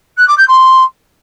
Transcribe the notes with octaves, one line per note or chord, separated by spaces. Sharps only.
F#6
D6
G6
C6